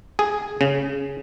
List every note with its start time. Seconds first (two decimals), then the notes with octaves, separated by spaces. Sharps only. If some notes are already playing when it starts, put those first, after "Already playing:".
0.19 G#4
0.61 C#3